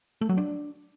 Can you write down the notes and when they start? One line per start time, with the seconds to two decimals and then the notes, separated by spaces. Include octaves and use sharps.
0.21 A3
0.29 F#3
0.37 D4